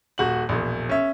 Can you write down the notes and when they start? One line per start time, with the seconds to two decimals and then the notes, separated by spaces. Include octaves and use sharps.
0.18 D#1 F#4 F#7
0.49 E1 A#1
0.89 C#4 E5